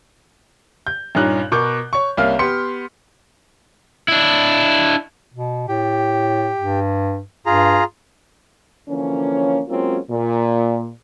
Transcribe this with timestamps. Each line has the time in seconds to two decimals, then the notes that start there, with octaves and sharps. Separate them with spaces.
0.87 G6
1.15 G2 A#2 C#4 D#4 F#6
1.52 B2 A#4 C#6 D6 G6
1.93 C#5 C#6
2.17 C2 A#3 C#4 F5 F6
2.39 B3 G4 C6 C#7
4.08 D4 E4
5.34 B2
5.68 A2 G4
6.58 G2
7.46 G2 F4 G#4 A#5
8.89 D3 E3 F3 A#3 C#4
9.69 F#3 G#3 A#3 C4 C#4 F4
10.11 A#2